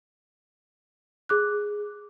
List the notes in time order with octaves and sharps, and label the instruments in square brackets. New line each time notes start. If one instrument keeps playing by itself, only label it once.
[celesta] G#4 D6 F#6